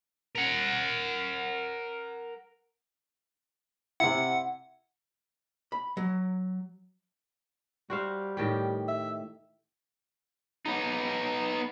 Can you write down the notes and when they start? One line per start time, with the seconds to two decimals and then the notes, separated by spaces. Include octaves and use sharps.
0.35 A#4 F#5
4.00 C3 E4 F#5
5.72 B5
5.97 F#3
7.90 G3 F#4 C5 F5
8.37 A2 D#3 G4
8.88 E5
10.66 B3 D#4